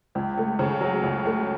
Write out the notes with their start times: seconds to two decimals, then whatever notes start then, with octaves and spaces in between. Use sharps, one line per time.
0.15 C#2
0.37 A3
0.59 C#3
0.81 F#3
1.03 C#2
1.26 A3